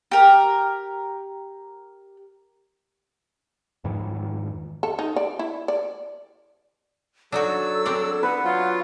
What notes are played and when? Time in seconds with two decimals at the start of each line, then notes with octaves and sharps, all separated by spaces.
0.11 G4 A#4
3.84 F2 G#2 D#3 E3
4.83 A4
4.99 D#4
5.16 D5
5.39 E4
5.68 D5
7.32 F#3 D4 D#4 F#4 A4 E6
7.86 C4 D4 D5
8.23 B3 B4 F#5
8.45 F#3 F4